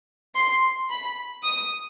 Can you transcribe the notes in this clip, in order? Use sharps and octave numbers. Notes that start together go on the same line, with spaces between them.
C6
B5
D#6